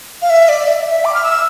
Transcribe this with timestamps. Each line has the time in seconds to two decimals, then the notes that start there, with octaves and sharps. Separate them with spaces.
0.22 F5
0.30 E5
0.49 D5
0.67 E5
0.86 E5
1.05 D6
1.15 F6
1.24 E6